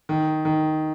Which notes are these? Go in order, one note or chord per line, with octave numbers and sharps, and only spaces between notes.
D#3
D#3